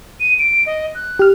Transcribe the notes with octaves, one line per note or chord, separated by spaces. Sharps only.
D#7
D7
D#5
F#6
G4 F6